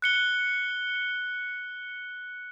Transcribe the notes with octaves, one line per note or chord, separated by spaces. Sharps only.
F#6 C#7 G7